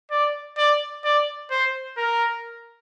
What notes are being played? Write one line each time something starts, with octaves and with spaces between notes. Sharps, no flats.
D5
D5
D5
C5
A#4